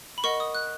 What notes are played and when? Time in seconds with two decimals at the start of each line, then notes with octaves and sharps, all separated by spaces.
0.18 B5
0.24 A#4 D#5 F#5 C#6
0.40 D#6
0.55 F#6